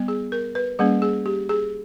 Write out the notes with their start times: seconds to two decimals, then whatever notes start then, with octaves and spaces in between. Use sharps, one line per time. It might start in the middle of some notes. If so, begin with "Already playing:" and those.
Already playing: G3 B3
0.08 G#4
0.32 A#4
0.55 B4
0.79 G3 A#3 C#4 G#4
1.02 G#4
1.26 G4
1.49 G#4